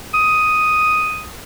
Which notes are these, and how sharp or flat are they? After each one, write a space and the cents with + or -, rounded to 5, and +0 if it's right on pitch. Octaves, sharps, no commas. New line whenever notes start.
D#6 +5